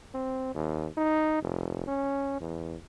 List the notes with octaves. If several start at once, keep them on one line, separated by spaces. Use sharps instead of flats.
C4
D#2
D#4
F1
C#4
E2